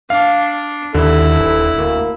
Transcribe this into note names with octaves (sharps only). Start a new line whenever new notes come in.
D4 F5
D#2 D3 E4 A4
D#1
D2 A#3